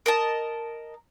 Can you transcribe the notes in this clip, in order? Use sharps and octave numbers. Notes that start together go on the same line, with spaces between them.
A#4 D#5 A5